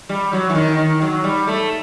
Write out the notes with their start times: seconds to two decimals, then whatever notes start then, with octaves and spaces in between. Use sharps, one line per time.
0.09 G3
0.33 F#3
0.49 E3
0.55 D#3
0.78 D#3
1.01 F#3
1.24 G3
1.47 A3